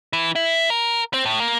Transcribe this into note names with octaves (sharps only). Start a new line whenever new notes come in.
E3
E4
A#4
C4
A2
A#3